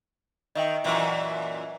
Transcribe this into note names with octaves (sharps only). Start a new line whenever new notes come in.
D#3 D#5 E5 G5
F#2 A#2 E3